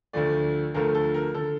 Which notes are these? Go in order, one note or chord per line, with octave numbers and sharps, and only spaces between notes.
D2 D3 F3 A3 D5
D2 D3 F3 A3 A#4
A4
A#4
D3 A4